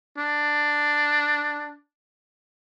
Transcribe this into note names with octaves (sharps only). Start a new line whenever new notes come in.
D4